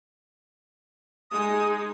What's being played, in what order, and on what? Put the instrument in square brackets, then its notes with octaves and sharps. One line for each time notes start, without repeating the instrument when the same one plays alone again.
[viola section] G#3 D#4 G#4 [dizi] D#6